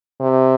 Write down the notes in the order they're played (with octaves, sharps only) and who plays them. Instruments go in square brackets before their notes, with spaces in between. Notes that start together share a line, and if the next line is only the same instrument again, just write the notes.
[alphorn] C3